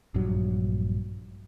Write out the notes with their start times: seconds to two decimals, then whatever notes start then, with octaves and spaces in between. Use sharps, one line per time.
0.14 A#1 G2 F#3